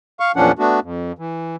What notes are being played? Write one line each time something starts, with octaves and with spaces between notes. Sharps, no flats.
F5 C#6
E2 A#2 F3 C#4 D4 F#5
A3 B3 D4 F#4
F2
E3